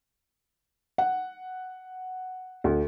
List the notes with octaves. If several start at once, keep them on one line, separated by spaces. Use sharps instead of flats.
F#5
D2